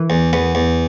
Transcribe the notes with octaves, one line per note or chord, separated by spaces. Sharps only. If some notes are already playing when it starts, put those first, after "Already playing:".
Already playing: E3
E2
E2 B3
E2